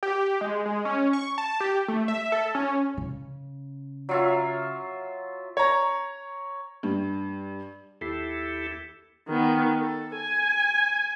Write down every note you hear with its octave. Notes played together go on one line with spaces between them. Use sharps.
G4
G#3
G#3
C#4
C#6
A5
G4
A3
E5
A4
C#4
C#3
F#3 F4 E5
C#5 A#5
G2
D#2 E4 G4 A4 B6 C7
D#3 B3
A4
G#5